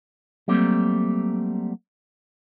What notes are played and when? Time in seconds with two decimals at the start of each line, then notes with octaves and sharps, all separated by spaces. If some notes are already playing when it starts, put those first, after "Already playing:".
0.48 F#3 G3 A3 A#3 C4